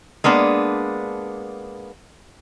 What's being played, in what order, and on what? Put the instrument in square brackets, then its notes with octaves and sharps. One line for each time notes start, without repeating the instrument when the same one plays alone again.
[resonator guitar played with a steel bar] G#3 A#3 B3 D4